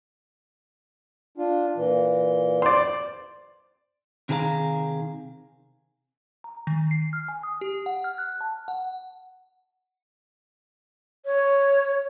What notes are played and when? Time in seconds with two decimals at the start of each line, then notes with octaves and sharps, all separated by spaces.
1.38 D4 F4
1.76 A#2 E3
2.62 C5 D5 C6
4.29 C3 D#3 G#4 A#4 F5 A#5
6.44 A#5
6.67 D#3
6.91 C7
7.13 F6
7.28 G#5
7.43 D#6
7.61 G4
7.86 F#5
8.04 F6
8.18 F#6
8.41 A5
8.68 F#5
11.26 C#5